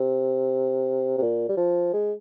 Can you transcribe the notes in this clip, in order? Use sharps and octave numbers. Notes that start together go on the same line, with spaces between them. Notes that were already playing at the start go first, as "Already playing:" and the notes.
Already playing: C3
C3
A#2
G3
F3
G#3